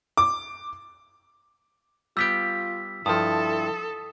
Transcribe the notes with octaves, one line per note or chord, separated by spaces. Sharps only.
D6
G3 B3 F4 G4 E6 B6 D7
G2 F3 E4 A4 D#6